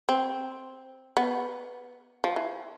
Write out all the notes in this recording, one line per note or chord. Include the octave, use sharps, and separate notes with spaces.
C4
B3
F3
E3